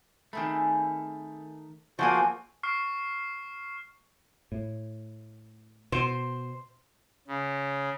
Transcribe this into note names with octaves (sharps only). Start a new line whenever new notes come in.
D#3 A3 C4 G#4 B5
F3 G3 A3 A#3 F#4 G#4 C5 D#6
C#6 F6 C7
A2
B2 C5
C#3